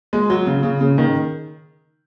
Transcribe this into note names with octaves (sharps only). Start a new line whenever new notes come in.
G#3
F#3
C#3
C#3
C#3
D#3